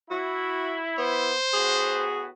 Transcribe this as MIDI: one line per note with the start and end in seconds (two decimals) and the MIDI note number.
0.11 1.33 64
0.11 0.80 66
0.98 1.34 59
0.98 2.05 72
1.53 2.29 45
1.53 2.29 59
1.53 2.29 66
1.53 2.23 68